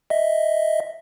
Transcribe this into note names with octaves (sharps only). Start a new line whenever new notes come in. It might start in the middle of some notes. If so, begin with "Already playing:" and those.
D#5 E5